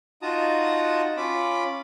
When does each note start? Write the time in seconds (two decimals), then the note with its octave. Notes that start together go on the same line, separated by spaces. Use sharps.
0.22 D#4 F4 F#4 A5 A#5 D#6
1.17 C#4 F4 B5 D6